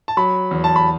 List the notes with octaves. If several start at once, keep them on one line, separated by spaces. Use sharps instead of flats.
A5
F#3 B5
E2
A5
B5